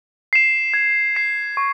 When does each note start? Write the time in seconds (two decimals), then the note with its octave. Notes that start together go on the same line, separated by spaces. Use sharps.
0.33 C7 E7
0.74 G#6
1.15 C7 E7
1.57 C#6